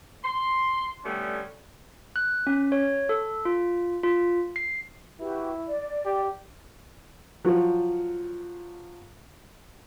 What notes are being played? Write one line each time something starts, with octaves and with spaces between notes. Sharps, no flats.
C6
D3 G3 A3 B3 C#4
F#6
C#4
C#5
A4
F4
F4
C7
E4 F#4 G4 B4
D5
G4
F3 F#3